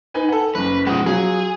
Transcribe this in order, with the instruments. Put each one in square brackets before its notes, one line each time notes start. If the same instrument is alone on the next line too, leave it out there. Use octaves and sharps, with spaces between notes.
[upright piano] D#4 B4 G#5
A4 F#5
[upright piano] F#1 F#2 [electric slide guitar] B4
[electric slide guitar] B2 F3 G#3 [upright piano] F#5 D#6
[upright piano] F#3 F4 [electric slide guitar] G#4